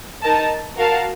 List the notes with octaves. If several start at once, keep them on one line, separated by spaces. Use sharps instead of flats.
D#4 A#4 D#5 A5
F#4 A#4 F5 A5